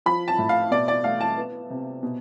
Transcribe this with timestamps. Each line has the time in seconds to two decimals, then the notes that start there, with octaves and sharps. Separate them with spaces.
0.06 F3 B5
0.28 A5
0.39 A2
0.49 F5
0.71 B2 D5
0.88 D5
1.04 A3 F5
1.21 A5
1.37 B3
1.70 C3
2.03 B2